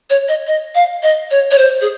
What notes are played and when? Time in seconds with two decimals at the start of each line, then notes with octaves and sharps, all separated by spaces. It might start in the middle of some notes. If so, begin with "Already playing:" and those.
0.10 C#5
0.28 D#5
0.47 D#5
0.75 F5
1.03 D#5
1.31 C#5
1.51 C#5
1.58 C5
1.81 G#4